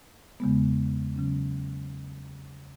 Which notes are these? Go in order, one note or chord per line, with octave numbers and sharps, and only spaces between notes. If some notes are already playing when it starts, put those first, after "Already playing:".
E2 C#3 G#3 B3
C#3 F#3 C#4